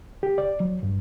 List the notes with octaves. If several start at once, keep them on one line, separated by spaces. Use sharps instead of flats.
G4
D5
F#3
G2